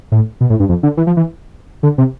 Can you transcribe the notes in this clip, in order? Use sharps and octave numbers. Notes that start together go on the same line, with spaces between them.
A2
B2
A2
G2
F2
D3
E3
F3
E3
D3
C3